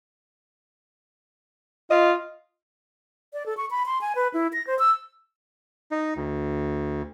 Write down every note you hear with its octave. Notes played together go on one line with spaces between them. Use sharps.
F4 D#5
D5
A4
C#6
B5
C6
G#5
B4
E4
A#6
C5
E6
D#4
D2